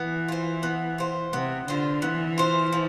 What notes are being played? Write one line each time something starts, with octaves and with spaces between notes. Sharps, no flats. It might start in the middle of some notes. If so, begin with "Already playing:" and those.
Already playing: E3 B3
F4 C5
B3
F4 C5
C3 B3
D3 F4 C5
E3 B3
F4 C5
F3